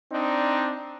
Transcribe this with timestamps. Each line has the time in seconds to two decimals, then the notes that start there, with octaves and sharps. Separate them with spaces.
0.12 C4 D4 D#4